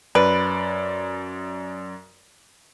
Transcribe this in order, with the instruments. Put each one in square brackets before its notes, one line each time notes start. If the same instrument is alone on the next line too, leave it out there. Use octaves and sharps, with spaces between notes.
[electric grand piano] F#2 D5 D7 [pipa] B4